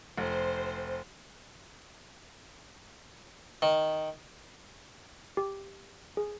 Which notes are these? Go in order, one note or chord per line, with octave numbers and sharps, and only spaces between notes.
F1 C5
D#3
G4
G#4